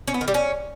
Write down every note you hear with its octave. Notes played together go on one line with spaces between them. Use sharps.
C#4
B3
D#3
G3
C#4